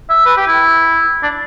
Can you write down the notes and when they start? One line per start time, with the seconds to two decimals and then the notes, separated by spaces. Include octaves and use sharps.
0.10 E5
0.26 B4
0.37 G4
0.47 E4
1.23 D4